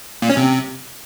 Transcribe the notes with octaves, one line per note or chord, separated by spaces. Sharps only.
A#2
C#4
C3